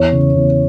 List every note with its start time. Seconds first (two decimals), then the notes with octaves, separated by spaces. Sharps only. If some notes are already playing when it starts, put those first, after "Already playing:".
Already playing: E2 C#5
0.13 C#3
0.34 E2